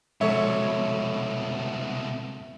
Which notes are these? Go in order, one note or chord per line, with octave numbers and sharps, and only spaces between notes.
C2 F2 B2 D3 G#3 A4 C#5 E5